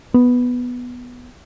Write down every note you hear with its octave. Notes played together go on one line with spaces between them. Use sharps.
B3